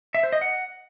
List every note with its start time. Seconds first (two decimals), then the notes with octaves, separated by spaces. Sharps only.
0.14 E5
0.23 C5
0.32 D#5
0.41 F#5